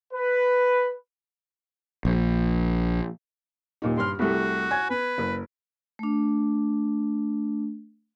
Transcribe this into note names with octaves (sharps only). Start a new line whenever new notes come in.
B4
A#1
D#1 A#2 D#4
G2 C6 F6
C2 G3 A3 F#4
G#5 G#6
B3 B4
F#1
A3 D4